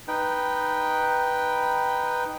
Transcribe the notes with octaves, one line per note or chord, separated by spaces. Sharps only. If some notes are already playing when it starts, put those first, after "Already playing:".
D#4 B4 G5